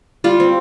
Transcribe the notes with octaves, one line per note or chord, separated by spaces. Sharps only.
G3 F4
C4